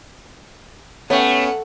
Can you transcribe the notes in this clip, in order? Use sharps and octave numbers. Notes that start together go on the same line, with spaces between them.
A3 B3 C#4 G4 C#5 F#5